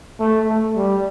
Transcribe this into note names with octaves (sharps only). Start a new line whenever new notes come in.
A3
A3
G3